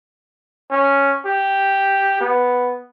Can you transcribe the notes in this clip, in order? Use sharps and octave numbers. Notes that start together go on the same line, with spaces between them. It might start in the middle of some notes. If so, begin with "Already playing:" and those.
C#4
G4
B3